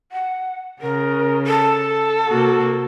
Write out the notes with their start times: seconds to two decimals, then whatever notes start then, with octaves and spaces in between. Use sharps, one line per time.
0.11 F#5
0.81 C#3 A#4
1.46 A4
2.26 C3 A#3 F#4